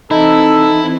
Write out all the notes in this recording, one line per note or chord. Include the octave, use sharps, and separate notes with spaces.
E3 C4 D#4 E4 A4